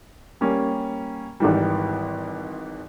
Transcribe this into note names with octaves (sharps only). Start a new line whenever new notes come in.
G3 A#3 C#4
G#1 G#2 E3 G3